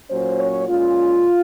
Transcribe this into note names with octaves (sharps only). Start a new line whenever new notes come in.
A#2 F#3 C#4 C5
C#5
A#2 G#3 C#4 F4